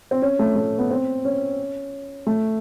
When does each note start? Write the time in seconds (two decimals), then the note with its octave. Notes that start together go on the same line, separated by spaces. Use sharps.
0.11 C4
0.22 C#4
0.39 A3
0.56 A3
0.78 B3
0.91 C4
1.25 C#4
2.27 A3